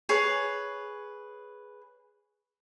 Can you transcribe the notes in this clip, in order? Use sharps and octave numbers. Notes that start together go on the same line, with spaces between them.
G#4 B4 C#5